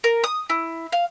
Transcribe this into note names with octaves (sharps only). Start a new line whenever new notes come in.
A#4
D#6
E4
F5